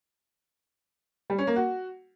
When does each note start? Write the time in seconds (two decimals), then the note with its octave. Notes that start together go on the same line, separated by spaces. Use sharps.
1.30 G3
1.38 C#4
1.47 A#3
1.56 F#4